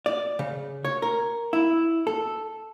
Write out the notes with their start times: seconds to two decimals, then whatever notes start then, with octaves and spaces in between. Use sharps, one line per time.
0.06 D5
0.39 C#3
0.85 C#5
1.02 A#4
1.53 E4
2.07 A4